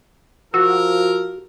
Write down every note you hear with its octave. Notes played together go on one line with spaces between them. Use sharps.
F3 F#4 A#4 E6